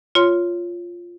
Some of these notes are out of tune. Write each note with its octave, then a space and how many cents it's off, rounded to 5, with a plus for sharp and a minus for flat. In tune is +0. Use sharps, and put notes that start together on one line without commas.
F4 +0 C#5 +0 C6 -5